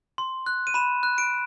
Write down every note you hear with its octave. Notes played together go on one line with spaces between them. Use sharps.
C6
F#6
D#7
B5 E7
F#6
D7